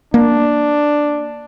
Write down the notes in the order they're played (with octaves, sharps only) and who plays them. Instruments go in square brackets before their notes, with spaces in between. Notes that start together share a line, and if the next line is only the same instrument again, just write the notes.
[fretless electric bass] A#3 [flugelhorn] D4